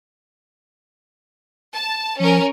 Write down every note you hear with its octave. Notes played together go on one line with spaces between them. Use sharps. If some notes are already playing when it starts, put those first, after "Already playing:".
A5
F3 C#4 A#4